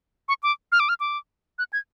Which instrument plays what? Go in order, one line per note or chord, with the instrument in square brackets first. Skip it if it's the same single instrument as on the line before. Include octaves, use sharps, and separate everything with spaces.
[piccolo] C#6
D6
F6
D6
F6
D6
F#6
G#6